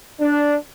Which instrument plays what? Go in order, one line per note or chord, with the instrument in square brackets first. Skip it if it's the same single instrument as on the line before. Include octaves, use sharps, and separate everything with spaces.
[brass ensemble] D4